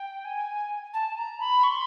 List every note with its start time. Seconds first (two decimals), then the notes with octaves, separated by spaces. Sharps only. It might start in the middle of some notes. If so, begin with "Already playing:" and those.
Already playing: G5
0.25 G#5
0.93 A5
1.17 A#5
1.40 B5
1.63 C#6
1.68 C6